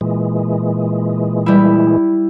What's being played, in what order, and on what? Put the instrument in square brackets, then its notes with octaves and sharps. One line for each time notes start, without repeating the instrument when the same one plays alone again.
[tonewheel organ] A#2 E3 G#3
[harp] G3 E4